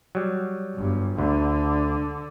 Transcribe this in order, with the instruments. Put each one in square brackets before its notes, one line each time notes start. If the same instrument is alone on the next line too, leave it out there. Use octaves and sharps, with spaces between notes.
[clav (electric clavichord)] F#3 G3
[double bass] G1 G2
[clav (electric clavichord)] D2 [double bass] D3 D4